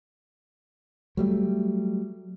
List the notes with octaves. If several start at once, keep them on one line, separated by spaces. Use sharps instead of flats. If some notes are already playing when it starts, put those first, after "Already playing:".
F#3 G3 A3